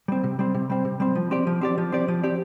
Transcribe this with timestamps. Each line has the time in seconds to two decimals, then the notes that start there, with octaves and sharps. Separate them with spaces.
0.08 G3 C4
0.24 C3
0.39 G3 C4
0.54 C3
0.70 G3 C4
0.85 C3
1.00 G3 C4
1.15 F3
1.31 C4 G4 D5
1.47 F3
1.61 C4 G4 D5
1.78 F3
1.92 C4 G4 D5
2.08 F3
2.23 C4 G4 D5